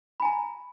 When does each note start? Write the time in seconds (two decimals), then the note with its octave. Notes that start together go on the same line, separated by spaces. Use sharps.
0.20 B5
0.22 G#5
0.25 A#5